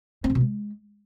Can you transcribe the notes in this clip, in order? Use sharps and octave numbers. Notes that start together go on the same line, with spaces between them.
C4
G#2
B2
G#3